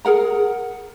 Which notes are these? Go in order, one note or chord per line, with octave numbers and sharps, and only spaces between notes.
G#4 A#4 F#5 A#5